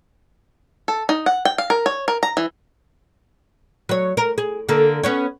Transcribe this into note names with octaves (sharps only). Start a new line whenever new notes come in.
A4
D#4
F#5
G5
F5
A#4
C#5
A#4
A#5
E3
F#3 C#5
A#4
G#4
D3 A#3 A4
B3 C#4 C#5